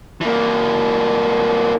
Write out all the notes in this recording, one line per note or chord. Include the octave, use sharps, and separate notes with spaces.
E3 A#3